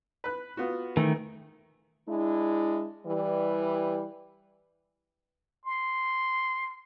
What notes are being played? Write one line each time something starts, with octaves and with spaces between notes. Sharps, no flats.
B4 F#6
B3 F4 F#4
D#3 E3 A3
G#3 D4 E4
E3 G3
C6